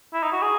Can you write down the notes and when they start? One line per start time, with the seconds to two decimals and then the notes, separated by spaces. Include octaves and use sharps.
0.13 E4
0.23 D#4
0.32 F#4
0.42 G#4